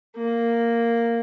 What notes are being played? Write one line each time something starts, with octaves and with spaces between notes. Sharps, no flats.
A#3